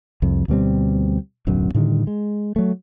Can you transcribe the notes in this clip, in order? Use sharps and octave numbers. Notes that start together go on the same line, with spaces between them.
C2 F2
D2 B2 G3 C4
D1 B1 F#2 F#3
A2 D3 D#3 G3
G#3
F#3 A3